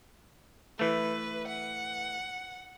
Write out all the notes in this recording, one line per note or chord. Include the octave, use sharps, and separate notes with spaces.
E3 A3 B4
F#5